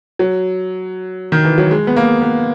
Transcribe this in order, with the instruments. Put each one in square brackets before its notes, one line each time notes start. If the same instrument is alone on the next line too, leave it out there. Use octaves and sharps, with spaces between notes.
[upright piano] F#3
D#3
E3
F#3
G#3
B3
A#3
B3